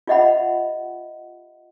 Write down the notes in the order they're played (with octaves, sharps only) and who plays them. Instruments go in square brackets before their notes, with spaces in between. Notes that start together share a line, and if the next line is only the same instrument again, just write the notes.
[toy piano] F4 G4 D#5 E5 F#5 B5